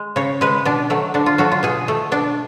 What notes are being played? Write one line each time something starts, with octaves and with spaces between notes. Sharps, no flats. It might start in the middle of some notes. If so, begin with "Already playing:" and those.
Already playing: G#3
C#3 C#5
G#3 B4
B2 D4
F#3 A3
D3 D4
F4
F#3 A3 F#4
F4
B2 G#4
A3
B2 D4